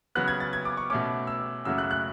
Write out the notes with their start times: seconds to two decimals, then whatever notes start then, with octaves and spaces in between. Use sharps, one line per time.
0.15 C#3 F#3 B3 F#6
0.28 G#6
0.40 A6
0.53 G#6
0.65 D6
0.77 C#6
0.90 B2 A3 C#4 D6
1.27 E6
1.65 F#2 C#3 F#3 A3 E6
1.78 F#6
1.91 F#6